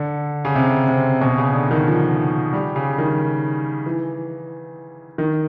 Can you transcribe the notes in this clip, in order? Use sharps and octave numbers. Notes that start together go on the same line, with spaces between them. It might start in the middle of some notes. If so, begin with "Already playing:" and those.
Already playing: D3
C#3
C3
C3
B2
C#3
D3
D#3
F3
G3
C#3
D#3
E3
D#3